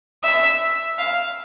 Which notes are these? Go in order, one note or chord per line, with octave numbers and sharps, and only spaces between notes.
E5
F5